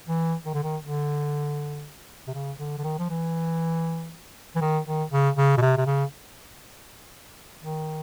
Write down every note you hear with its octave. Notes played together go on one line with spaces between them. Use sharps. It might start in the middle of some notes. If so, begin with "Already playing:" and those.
E3
D#3
D3
D#3
D3
C3
C#3
D3
D3
D#3
F3
E3
E3
D#3
D#3
C#3
C#3
B2
C3
C3
C#3
D#3